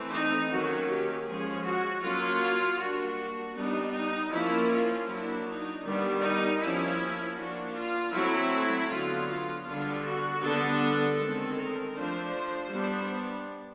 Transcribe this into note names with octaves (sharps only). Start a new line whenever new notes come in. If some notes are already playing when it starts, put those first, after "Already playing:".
Already playing: E3 A3 C4
D#4
D#3 F#3 A#3 C#4 F#4
G4
F3 G#3 C#4 G#4
F#4
F#3 A#3 C#4 F4
G3 A#3 D4 F#4
G3 B3 D4 D#4
D#4
F3 A#3 C#4 E4
F4
F#3 A#3 D4 E4
D#4
D#3 G3 B3 D4
D#4
F3 A#3 C#4 E4
F3 A#3 D4 F#4
F4
F#3 A3 C4 E4
D3 F#3 B3 F4
F4
D3 G3 B3 D4 F4
F#4
D3 G3 B3 D4 A4
D#3 G#3 C4
A#4
F3 A3 D4 C5
G3 B3 D4